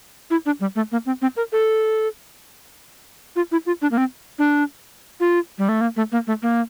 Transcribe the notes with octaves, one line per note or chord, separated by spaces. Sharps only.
E4
D4
G3
A3
A#3
C4
C4
A#4
A4
F4
E4
F4
D4
A#3
C4
D4
F4
G3
A3
A#3
A3
A#3
A3
A#3